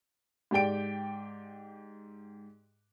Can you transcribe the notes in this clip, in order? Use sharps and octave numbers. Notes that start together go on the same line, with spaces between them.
G#2 G4 D5 G5 D7